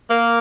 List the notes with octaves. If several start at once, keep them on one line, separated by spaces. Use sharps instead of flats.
A#3